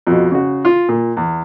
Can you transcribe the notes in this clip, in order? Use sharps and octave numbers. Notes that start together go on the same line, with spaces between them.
F2 B2
C#3 F#4
F4
A#2
E2